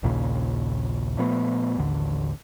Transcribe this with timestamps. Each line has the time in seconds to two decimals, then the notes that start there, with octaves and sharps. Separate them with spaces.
0.03 A#1 D#2 A#2 C#3
1.18 A#2 F3 A3 B3
1.77 A1 D#2 D3